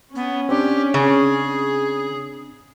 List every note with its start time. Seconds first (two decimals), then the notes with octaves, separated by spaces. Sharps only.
0.15 B3 C#4
0.49 C4 D4 G4
0.94 C#3 G#4